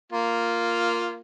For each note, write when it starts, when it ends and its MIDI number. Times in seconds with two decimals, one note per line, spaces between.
0.12 1.20 58
0.12 1.20 65